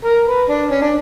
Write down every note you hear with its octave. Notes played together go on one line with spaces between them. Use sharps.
A#4
B4
D4
C#4
D4